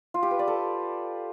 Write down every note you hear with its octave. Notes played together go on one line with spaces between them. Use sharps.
F4
G4
B4
D5
A4